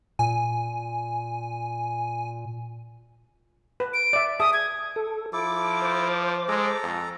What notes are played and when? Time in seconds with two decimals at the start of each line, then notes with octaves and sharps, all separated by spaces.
0.19 A#2 G#5
3.80 B4
3.94 D7
4.13 D5 E5
4.40 G#4 E5 A5 D#6
4.53 G#6
4.96 A4
5.33 F3 E4 A4 D6
5.82 C5 D6
6.48 G#3 A4 A#5
6.83 F2